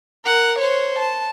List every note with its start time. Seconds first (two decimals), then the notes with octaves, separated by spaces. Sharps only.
0.25 A#4 F#5
0.59 C5 C#5
0.99 A5